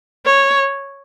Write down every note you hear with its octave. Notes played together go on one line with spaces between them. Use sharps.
C#5